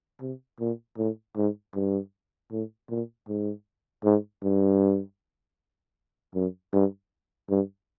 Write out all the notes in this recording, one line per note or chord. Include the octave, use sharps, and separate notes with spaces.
C3
A#2
A2
G#2
G2
A2
A#2
G#2
G#2
G2
F#2
G2
G2